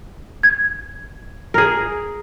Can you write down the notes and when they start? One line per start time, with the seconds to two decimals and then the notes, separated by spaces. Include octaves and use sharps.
0.43 G#6
1.54 G#4 A#4